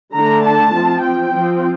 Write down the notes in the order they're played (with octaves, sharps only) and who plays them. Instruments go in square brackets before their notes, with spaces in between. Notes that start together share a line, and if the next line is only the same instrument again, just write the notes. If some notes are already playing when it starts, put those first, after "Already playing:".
[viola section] D3 A3 D4 A#5
A5
F3 C4
G5
F3 C4